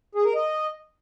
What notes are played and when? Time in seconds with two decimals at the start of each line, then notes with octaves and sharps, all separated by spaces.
0.15 G#4
0.25 A#4
0.35 D#5